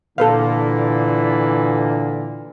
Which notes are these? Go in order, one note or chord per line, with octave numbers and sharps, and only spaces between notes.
A#2 D3 E3 A#3 A4 B4 F5